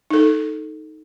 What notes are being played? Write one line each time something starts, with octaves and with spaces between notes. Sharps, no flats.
D#4 A4